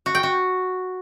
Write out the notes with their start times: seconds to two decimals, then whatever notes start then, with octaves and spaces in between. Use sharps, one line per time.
0.06 F#4
0.15 G5
0.23 F#4